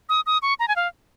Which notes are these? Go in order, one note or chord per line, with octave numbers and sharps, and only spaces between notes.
D#6
D#6
C#6
A#5
G#5
F5